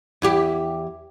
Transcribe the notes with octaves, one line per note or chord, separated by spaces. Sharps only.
E2 E4 G4